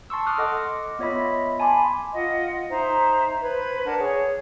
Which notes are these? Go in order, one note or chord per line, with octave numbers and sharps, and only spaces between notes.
A5 C6 C#6 E6
C6 D6 D#6 F6 F#6
A4 D#5 F#5 D6
B3 F4 C#5 D#5 E5 B5
G#5 A5 B5 C6 D6
F4 D#5 F#5
D#4 C5 E5 A#5
B4 C5 G#6
D4 A#4 F#5 A5
G#4 C#5